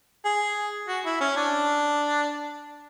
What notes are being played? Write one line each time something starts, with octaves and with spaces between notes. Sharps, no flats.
G#4
F#4
E4
C#4
D4